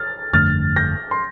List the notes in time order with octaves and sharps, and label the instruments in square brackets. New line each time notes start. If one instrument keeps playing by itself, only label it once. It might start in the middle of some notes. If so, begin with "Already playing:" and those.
Already playing: [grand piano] F6 A6
[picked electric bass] G1 F2 D3 A3 [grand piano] F6 A6
[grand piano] G6 A#6
C6